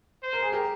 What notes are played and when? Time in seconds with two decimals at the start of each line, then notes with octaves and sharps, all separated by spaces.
0.23 C5
0.33 A#4
0.42 G#4
0.52 G4 A#4